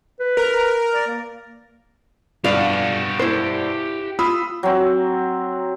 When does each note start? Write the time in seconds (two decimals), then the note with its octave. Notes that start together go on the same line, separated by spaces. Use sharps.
0.20 B4
0.37 A#4
0.93 D5
1.07 A#3
2.44 G2 B2 G4 D5 F5 F#5
3.19 E4 C5
4.19 F4 B5 D#6 E6
4.63 F#3 C4